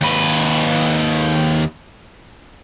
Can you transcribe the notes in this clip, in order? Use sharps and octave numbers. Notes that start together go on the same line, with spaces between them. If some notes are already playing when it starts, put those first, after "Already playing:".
D#2 B4